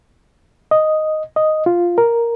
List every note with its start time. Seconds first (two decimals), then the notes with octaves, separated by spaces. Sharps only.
0.71 D#5
1.36 D#5
1.66 F4
1.98 A#4